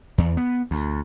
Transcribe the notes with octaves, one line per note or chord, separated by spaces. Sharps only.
E2
B3
D2